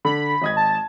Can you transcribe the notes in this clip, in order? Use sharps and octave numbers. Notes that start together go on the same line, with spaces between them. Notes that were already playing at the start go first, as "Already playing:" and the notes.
D3 B5
G#1 D#5 G#6
A5